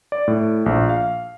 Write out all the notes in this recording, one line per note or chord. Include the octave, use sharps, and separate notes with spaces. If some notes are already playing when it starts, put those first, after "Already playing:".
D5
A2
A#1
F5